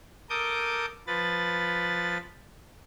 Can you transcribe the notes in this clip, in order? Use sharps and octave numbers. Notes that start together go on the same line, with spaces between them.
A4 A#4 D6 D#6 G6
F3 B4 A6